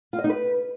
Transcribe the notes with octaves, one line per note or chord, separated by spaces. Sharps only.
F4
D#5
D#4
B4